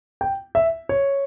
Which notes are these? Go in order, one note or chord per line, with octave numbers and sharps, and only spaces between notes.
G5
E5
C#5